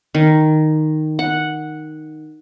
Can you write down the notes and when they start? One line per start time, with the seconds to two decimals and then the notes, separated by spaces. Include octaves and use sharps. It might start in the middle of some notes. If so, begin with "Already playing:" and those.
0.15 D#3
1.19 F#5